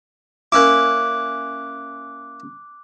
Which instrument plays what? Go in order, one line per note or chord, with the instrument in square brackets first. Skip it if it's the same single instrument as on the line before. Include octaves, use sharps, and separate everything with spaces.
[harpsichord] A#3 C#4 E4 [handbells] D6 F#6